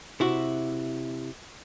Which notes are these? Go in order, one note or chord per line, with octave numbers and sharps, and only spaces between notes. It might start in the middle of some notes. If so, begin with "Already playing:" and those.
C3 E4 F#4